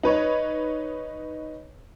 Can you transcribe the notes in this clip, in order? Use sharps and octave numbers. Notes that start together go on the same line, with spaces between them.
D#4 B4 C#5 D#5